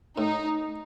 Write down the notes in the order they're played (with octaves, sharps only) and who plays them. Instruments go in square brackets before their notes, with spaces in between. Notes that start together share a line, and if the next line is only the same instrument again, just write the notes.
[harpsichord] A2 [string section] D#4